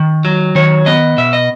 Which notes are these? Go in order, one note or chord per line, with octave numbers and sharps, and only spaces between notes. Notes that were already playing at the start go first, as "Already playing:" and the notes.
Already playing: D#3
F#3
D#3 C#5
B3 D#5
B2 E5
D#5